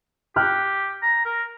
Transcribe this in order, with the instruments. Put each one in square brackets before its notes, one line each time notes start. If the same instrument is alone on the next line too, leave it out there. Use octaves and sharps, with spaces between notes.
[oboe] G4 [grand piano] G5 F6 F#6
[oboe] A#5
A#4